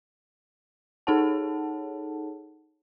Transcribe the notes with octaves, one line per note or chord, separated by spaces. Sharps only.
D#4 G#4 A4 C#5 F#5 A5